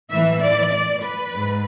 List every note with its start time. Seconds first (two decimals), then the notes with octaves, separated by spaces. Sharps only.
0.11 A2 E3 E5
0.41 D5
0.73 D5
1.03 B4
1.35 G#2